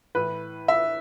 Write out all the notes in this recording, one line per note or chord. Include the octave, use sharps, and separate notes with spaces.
A2 E3 B4
E5